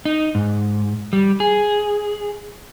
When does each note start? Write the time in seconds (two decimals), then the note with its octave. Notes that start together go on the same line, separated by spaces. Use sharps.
0.05 D#4
0.35 G#2
1.13 G3
1.40 G#4